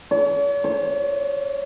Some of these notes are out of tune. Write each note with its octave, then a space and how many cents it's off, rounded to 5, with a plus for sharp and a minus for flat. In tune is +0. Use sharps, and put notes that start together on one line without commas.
C#5 +45
C#5 -30